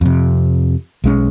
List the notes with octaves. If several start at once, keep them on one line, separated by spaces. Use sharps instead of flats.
F2 C3
B1 G#3 C#4